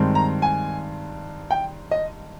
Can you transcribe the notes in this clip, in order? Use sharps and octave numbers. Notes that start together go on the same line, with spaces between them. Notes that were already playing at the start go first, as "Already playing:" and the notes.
Already playing: G2 D#3 G#3 C4
A#5
G#5
G5
D#5